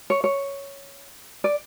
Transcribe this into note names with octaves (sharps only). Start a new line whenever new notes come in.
C#5
C#5
D5